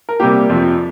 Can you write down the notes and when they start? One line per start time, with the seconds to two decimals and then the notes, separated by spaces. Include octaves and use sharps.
0.09 A#4
0.20 C3 G3 A#3 G4
0.49 F2 C3 F3